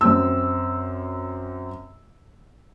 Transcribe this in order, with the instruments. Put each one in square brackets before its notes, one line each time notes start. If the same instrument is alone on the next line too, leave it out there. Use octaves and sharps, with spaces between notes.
[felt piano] F#2 C4 E6